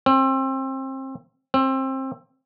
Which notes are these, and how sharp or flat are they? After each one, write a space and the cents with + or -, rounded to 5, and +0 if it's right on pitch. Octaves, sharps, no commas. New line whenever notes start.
C4 +30
C4 +25